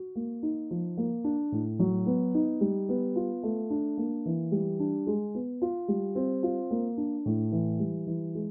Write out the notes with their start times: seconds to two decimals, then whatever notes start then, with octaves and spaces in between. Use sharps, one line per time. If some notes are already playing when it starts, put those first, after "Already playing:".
Already playing: F#4
0.16 A#3
0.43 D#4
0.71 F3
0.97 A#3
1.24 D4
1.52 A2
1.79 F#3
2.06 B3
2.34 D#4
2.61 G3
2.89 B3
3.16 F4
3.43 A3
3.70 D4
3.98 A#3
4.26 E3
4.52 G3
4.80 D4
5.07 G#3
5.35 B3
5.62 F4
5.88 G3
6.16 C4
6.43 F4
6.71 A#3
6.97 D4
7.26 A2
7.52 E3
7.80 G3
8.07 E3
8.35 G#3